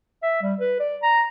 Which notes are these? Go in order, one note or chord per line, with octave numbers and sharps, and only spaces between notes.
E5
G3
B4
D5
A#5